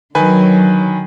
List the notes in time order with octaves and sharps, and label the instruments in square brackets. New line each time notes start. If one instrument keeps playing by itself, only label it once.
[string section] D3 F#3 [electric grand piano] D#3 B4 G#5